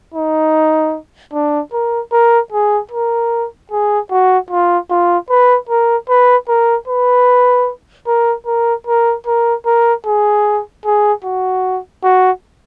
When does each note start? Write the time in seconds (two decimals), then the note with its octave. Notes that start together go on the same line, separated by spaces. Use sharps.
0.14 D#4
1.33 D4
1.73 A#4
2.12 A#4
2.52 G#4
2.92 A#4
3.72 G#4
4.11 F#4
4.51 F4
4.90 F4
5.30 B4
5.69 A#4
6.09 B4
6.48 A#4
6.88 B4
8.07 A#4
8.46 A#4
8.87 A#4
9.27 A#4
9.66 A#4
10.06 G#4
10.85 G#4
11.24 F#4
12.03 F#4